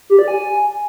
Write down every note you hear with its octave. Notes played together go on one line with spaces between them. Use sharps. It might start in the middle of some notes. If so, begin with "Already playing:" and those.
G4
D5
G#5